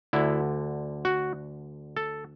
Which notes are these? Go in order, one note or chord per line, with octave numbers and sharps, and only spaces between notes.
D2 D3 E4
F#4
A4